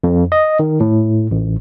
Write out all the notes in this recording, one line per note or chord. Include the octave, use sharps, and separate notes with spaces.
F2
D#5
D#3
A2
A1